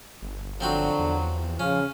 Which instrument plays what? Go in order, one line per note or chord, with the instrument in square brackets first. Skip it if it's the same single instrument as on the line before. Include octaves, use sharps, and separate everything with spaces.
[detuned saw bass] G1
[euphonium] D3 [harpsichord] F3 C4 F#4 [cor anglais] F#3
[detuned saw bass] E2
[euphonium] C#3 [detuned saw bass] F3 [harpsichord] C#4 [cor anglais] F5